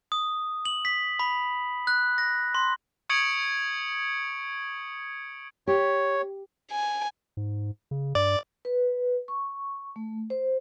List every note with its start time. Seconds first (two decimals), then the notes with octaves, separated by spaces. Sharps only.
0.12 D#6
0.65 F#7
0.85 B6
1.19 B5
1.87 F#6
2.18 A#6
2.55 C6
3.09 C#6 D#6 G#6 C#7 D7 F#7
5.68 G4 C#5
6.72 G#5
7.37 G#2
7.91 C#3
8.15 G2 D5
8.65 B4
9.28 C#6
9.96 A3
10.30 C5